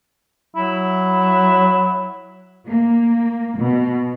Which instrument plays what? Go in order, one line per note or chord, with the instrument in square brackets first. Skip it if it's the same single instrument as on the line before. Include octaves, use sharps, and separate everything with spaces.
[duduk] F#3 [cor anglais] E4
[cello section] A#3
B2